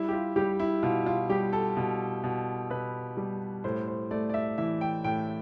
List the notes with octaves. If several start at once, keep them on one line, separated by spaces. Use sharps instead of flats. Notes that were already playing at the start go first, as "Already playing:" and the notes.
Already playing: G3 E4
G4
F4
G3 G4
E4
B2 F4
F4
G3 G4
A4
B2
B2
B2 B4
G3
A2 C5
C5
A3 D5
D5
E5
E3 E5
G5
A2 G5